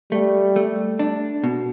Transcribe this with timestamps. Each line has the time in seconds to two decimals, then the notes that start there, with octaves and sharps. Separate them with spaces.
0.11 G3 A3
0.56 A3
0.99 D4
1.44 B2